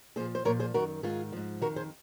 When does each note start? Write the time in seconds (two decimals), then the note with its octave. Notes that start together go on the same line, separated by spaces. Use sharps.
0.16 A#2 F3 G#4 C5
0.35 C5
0.45 A#2 F3 A#4 C#5
0.60 G#4 C5
0.74 F#2 D#3 F#4 A#4
1.03 G#2 D#3 F4 G#4
1.32 G#2 F3
1.61 D#3 F#4 A#4
1.65 F2
1.76 G#4 C5